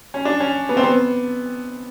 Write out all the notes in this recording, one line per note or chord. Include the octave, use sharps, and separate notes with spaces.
C#4
D4
C#4
B3
C4
B3